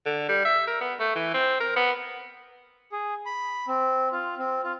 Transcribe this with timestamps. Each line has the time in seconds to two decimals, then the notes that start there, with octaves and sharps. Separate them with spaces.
0.06 D3
0.29 G3
0.45 E5
0.68 A#4
0.81 B3
1.00 A3
1.16 E3
1.34 C4
1.61 A#4
1.77 B3
2.92 G#4
3.26 B5
3.68 C4
4.12 F4
4.38 C4
4.64 F4